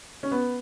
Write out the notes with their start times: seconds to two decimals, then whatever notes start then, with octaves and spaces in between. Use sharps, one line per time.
0.23 C#4
0.31 B3